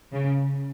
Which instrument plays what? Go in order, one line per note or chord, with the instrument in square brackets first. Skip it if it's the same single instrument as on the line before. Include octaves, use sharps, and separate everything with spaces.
[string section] C#3